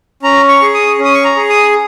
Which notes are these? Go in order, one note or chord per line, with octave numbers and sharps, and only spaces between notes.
C#4 A#5
C#6
G#4
D#6
C#4
D#6
C#6
A#5
G#4
D#6